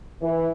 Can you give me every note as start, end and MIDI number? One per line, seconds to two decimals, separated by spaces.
0.21 0.48 52